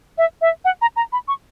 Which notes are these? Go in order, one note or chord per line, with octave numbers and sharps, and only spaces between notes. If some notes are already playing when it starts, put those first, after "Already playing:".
E5
E5
F#5
A#5
A#5
B5
C#6